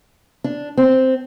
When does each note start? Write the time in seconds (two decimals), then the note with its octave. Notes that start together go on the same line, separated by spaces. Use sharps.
0.44 D4
0.77 C4